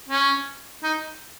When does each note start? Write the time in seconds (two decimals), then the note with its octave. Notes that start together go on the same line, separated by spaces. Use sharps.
0.09 C#4
0.83 D#4